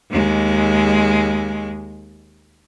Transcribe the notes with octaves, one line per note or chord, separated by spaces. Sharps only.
D#2 G#3